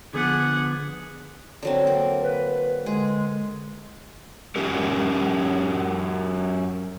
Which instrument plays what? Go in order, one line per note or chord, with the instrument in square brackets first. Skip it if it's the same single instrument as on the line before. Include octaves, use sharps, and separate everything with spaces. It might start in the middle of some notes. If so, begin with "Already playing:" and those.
[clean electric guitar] D3 F3 B3 [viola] G#4 F#5
[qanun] D3 F#3 C4
A#3
[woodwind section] B4
[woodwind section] D3 G#3 [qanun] G#4
[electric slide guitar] F#2 C#4 G4 A#4